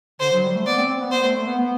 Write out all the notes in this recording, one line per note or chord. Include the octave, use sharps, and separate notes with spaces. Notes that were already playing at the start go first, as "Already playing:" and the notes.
D3 C5
F#3
G3
A3
B3 D5
C4
C4
B3
B3 C5
A3
A3
B3
B3